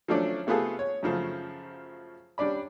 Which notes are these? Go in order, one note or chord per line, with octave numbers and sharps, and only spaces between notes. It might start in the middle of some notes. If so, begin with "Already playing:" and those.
F3 F#3 A3 C#4 D4
C3 A3 B3 F4 G#4 A4
C#5
F#2 C#3 F3 A3
G3 C#4 D4 D5 B5